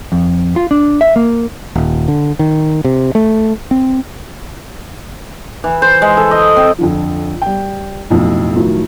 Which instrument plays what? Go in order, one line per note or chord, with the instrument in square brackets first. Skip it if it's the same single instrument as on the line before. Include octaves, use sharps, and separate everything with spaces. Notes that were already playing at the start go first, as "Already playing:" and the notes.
[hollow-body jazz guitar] F2
F4
D4
E5
A#3
[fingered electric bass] D#1
D3
D#3
C3
A3
C4
[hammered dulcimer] E3
C5
G#3
A4
D#5
C4
[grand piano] F2 D3 F3
G3 G5
B1 F2 A2
A2 D#3 F3 F#3